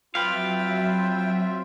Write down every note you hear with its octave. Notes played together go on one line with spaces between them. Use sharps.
F#3 C4 F4 B4 E5 F5 G5